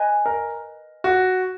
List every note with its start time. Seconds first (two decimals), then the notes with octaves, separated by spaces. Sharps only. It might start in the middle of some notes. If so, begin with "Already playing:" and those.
Already playing: B4 D#5 G#5
0.26 A#4
1.04 F#4